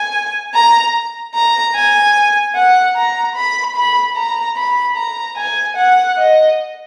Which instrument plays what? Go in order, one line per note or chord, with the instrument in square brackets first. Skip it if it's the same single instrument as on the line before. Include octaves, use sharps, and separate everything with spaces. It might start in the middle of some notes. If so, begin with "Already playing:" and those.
Already playing: [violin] G#5
A#5
A#5
G#5
F#5
A#5
B5
B5
A#5
B5
A#5
G#5
F#5
D#5